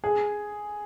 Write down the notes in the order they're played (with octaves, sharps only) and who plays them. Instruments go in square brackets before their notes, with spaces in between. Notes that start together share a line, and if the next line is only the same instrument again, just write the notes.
[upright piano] G#4